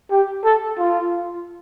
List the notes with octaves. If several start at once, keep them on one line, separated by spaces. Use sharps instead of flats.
G4
A4
F4